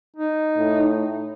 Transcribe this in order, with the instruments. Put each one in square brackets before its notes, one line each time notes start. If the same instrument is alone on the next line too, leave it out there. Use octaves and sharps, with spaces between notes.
[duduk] D#4
[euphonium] A2